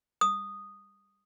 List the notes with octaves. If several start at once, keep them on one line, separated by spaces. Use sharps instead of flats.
D#6